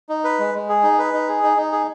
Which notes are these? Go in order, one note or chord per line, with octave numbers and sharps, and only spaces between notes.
D#4
B4
G#3
G#3
G#4
D#4
B4
D#4
G#4
D#4
D#4
G#4